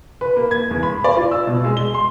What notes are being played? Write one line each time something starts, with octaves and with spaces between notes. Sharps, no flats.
B4
A#3
G#6
E2
B5
D5
F4
E6
B2
G#3
G7
C6